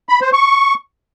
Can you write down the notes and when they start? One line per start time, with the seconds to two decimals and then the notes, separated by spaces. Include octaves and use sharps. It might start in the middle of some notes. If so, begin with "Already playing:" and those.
0.09 B5
0.21 C5
0.33 C#6